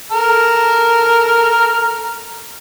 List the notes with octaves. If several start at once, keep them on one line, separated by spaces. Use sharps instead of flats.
A4 A#5 F6